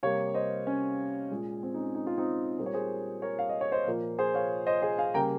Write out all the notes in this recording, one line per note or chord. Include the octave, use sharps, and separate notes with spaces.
C3 G3 A#3 C#5 F5
C5 D#5
C#4
A#2 G#3
C4
D#4
C#4
D#4
F4
C4 D#4
A#2 G3 A#3 C5
C#5
G#4 C5
A#4 C#5
F5
D#5
C#5
C5 D#5
A#2 F3 A#3
G#4 C5
C#5 F5
C5 D#5
G#4 C5
F5 G#5
C#3 G3 A#3 G5 A#5